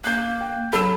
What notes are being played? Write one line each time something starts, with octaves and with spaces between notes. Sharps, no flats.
A#3 F#6 G6
G5
F#3 A4 B5 E6 E7